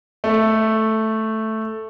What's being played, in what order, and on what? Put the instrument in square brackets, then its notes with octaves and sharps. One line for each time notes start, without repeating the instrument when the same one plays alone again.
[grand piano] A3